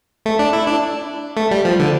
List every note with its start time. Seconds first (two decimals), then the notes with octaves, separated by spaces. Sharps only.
0.26 A3
0.39 D4
0.53 E4
0.67 D4
1.37 A3
1.51 G3
1.65 F3
1.79 D3